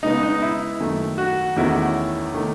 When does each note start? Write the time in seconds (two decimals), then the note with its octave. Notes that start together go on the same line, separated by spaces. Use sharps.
0.03 C#3 G#3 B3 D#4
0.23 D#4
0.42 E4
0.80 F#2 D#3 A3
1.18 F#4
1.56 E2 D#3 A3 C#4 E4 F#4
2.34 D#3 A3